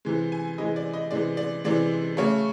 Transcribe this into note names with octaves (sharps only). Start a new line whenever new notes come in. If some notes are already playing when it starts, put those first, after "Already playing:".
C3 E3 G#3
G#5
C3 E3 G#3 D#5
D5
D#5
C3 E3 G#3 D5
D5
C3 E3 G#3 D5
C#3 F#3 A3 C#5